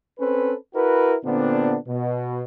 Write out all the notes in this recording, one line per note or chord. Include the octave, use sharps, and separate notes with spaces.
C4 C#4 A4 B4
E4 F#4 A#4 B4
A#2 D3 B3 C4 D4
B2